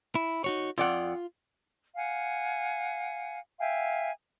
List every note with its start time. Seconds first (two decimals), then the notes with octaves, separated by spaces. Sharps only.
0.15 E4
0.44 D#4 F#4 C#5
0.78 F2 F4 D5 F#5
1.96 F5 F#5 G#5
3.59 E5 F5 G5 G#5